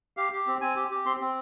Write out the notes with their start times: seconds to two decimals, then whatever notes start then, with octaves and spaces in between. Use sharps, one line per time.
0.17 G4 F5
0.33 G4
0.47 C4
0.61 C4 G#5
0.76 G4
0.91 G4
1.05 C4 C6
1.20 C4